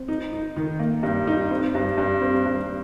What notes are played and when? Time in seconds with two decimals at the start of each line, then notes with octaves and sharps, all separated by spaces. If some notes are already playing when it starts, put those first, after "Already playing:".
Already playing: C4
0.08 D#4
0.33 D#4
0.56 D#3
0.79 A#3
1.03 G2
1.27 D#4
1.51 C4
1.75 G2
1.98 G2
2.21 C4
2.46 G2